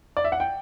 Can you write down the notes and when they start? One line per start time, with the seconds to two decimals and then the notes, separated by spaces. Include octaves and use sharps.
0.17 D5
0.24 E5
0.32 F#5
0.40 G5